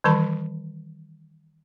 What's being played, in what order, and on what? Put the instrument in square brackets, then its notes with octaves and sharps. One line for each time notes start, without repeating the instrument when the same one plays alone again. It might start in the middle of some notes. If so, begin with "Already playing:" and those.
[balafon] D#3 E3 G3 A5 B5